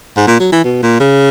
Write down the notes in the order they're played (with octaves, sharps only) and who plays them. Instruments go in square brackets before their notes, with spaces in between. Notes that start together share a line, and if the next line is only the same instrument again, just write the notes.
[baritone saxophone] G#2
A#2
F#3
E3
B2
A#2
C#3